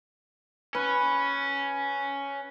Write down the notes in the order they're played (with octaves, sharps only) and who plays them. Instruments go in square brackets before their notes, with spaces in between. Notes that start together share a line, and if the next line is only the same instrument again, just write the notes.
[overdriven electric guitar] C#4 [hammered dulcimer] B4